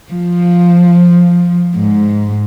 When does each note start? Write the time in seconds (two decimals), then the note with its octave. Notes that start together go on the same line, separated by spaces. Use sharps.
0.10 F3
1.74 G#2